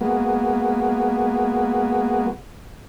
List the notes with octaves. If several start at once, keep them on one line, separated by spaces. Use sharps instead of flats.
G#3 A#3 B3 F#4